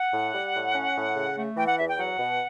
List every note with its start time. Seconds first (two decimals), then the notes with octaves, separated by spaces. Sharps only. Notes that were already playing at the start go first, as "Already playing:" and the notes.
Already playing: F#5
0.12 A2
0.33 G3
0.54 A2
0.75 C#4
0.95 A2
1.16 C#3
1.36 A3
1.57 E3 G5
1.67 F#5
1.78 E2 E5
1.89 G5
1.99 F#3 F#5
2.19 B2